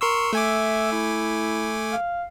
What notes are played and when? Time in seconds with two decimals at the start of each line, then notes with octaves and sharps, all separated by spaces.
0.01 A#4 C6 C#6 E6
0.33 A3 E5 G#5 D6
0.92 E4
1.92 F5